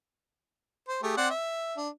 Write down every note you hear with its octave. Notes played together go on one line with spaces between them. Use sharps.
C5
A3 G4 G#4
C4 D5 F#5
E5
D4